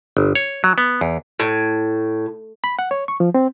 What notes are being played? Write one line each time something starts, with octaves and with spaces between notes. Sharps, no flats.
G1
C#5
F#3
B3
E2
A2
B5
F#5
C#5
C#6
F3
C4